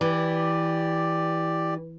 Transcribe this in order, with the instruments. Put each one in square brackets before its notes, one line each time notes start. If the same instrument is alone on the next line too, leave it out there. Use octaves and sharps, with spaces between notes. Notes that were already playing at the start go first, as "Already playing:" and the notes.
[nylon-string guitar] E3 [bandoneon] G4 D5